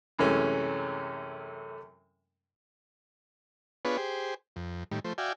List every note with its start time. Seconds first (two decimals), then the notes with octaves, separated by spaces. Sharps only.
0.19 F#2 C3 E3 G#3 A3 C#4
3.85 B3 D4 F4 G#4 B4 C#5
3.97 G4 G#4 C5
4.56 F2
4.91 A2 D#3 G3
5.05 F3 A3 C5
5.18 F#4 D5 E5 F5 G5 G#5